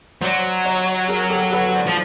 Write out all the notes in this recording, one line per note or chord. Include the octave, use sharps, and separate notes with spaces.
F#3 C5 D5
C#5 D#5
G#4 A#4
G4 A4
A4 B4
C5 D5
F3